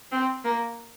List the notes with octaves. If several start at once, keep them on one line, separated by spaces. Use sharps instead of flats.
C4
A#3